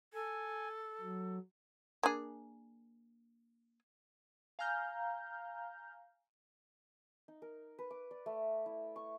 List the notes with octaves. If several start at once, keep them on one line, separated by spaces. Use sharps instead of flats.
A4 G#5
F#3
A#3 D4 G#4
F5 G#5 A#5 F6 G6
D#4
A#4
B4
D6
D5
A3
E4
C#6